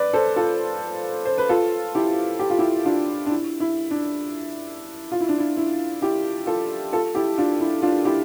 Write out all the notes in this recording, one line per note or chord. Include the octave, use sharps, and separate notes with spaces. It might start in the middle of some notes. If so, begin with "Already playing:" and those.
Already playing: B4 D5
A4 C5
F4 A4
C5
B4
F4 A4
E4 G4
G4
F4
E4 G4
D4 F4
D4
E4
E4
D4
F4
E4
D4
E4
E4
E4 G4
F4 A4
F4 A4
E4 G4
D4 F4
E4
D4 F4
E4 G4